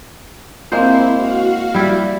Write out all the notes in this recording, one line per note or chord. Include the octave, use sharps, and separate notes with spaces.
G#3 A#3 C4 E4 C5
F#4 F5
G3 E4